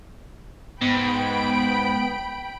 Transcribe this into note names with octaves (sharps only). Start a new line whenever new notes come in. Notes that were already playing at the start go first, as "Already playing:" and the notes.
G#2 B3 G5 B5 D7